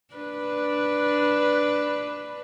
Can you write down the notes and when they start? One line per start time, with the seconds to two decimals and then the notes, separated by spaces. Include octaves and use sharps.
0.15 D4 B4